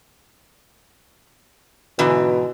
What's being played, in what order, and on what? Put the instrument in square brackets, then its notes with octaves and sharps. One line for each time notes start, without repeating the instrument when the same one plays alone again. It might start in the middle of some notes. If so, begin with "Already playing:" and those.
[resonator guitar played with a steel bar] G#2 D3 E3 [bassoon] B2